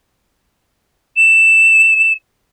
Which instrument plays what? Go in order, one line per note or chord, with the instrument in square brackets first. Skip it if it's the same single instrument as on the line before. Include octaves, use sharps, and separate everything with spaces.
[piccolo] E7